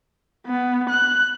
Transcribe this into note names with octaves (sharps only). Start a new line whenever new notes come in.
B3
F#6